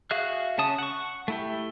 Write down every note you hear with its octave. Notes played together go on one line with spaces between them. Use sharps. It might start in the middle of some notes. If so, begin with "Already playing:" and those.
F#4 G#4 E5 F5 F#6
C#3 C#4 A5 D#6
F#5 C#6
A3 E4 G4